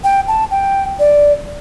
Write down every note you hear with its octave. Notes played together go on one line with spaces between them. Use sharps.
G5
A5
G5
D5